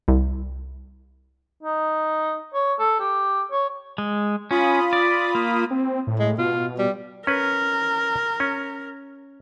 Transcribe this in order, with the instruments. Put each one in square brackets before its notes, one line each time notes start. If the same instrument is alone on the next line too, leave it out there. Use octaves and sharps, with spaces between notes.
[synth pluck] C2
[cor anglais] D#4
C#5
A4
G4
C#5
[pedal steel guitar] G#3
[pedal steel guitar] C#4 [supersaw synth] F4 B5 D#6
[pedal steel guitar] D5
A#3
[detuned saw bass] C4
A2
[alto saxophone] G#3
[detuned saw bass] B2 [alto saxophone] F4
[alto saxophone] G3
[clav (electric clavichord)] C#4 B4 [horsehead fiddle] A#4
[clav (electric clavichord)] C#4